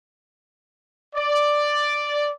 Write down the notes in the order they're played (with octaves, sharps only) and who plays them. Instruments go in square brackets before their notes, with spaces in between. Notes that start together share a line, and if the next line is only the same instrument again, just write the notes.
[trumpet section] D5